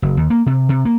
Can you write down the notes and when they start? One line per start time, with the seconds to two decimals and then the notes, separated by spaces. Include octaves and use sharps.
0.02 F#1
0.17 D#2
0.30 A#3
0.46 C3
0.69 C3
0.85 A#3